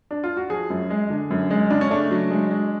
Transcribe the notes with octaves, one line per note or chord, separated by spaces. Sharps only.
D4
F4
F#4
F3 G#4
F#2
G#3
D3
F#2
G#3
C#3 D4
C#4
A3 D4
F#3
G#3
G#3